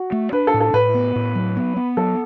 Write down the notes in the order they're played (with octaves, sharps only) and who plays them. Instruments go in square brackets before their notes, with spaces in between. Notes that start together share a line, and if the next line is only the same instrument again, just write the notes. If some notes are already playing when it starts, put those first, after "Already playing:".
Already playing: [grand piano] F#4
[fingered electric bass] A3
[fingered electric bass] D4 [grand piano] B4
[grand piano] A4
[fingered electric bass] A2
[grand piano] A4
[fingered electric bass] A2 [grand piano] B4
[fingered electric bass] B3
A2
F#3
B3
B3
[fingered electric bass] F#3 [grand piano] A4